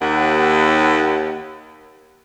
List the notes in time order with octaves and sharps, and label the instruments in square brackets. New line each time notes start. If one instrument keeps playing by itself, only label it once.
[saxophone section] D#2 F#5